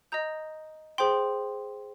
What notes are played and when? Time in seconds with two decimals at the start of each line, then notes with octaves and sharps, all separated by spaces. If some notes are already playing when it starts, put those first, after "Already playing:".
0.12 D#5 A#5 D#6 G6
0.98 G#4 C5 G5 C6